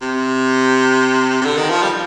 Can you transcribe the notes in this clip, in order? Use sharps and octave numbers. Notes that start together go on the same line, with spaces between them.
C3
C3
D3
D#3
F3
G3